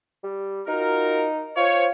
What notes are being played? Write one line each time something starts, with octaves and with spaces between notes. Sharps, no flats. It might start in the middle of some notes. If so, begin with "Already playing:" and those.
G3
D#4 F4 F#4 A#4
F4 C5 C#5